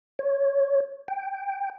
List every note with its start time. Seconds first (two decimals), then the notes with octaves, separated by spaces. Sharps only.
0.19 C#5
1.08 G5